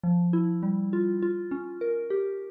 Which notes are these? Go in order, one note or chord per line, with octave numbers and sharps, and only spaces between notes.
F3
E4
G3
F4
F4
C#4
A#4
G4